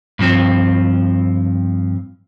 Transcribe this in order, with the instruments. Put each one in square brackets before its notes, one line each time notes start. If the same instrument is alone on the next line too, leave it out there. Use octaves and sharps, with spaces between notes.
[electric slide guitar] G2 F3 C4